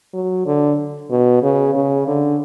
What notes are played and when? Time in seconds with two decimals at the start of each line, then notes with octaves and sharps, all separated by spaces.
0.14 F#3
0.46 D3
1.11 B2
1.43 C#3
1.75 C#3
2.07 D3